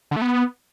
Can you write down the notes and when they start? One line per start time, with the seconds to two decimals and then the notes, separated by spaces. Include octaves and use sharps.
0.11 D3
0.16 A3
0.22 B3